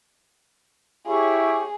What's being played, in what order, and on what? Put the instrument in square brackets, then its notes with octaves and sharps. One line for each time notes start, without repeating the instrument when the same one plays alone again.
[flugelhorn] E4 [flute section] G4 C#5 C#6 [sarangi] G#4